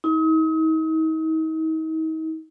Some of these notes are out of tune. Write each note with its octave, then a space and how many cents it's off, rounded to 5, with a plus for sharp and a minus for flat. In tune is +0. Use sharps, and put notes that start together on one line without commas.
D#4 +40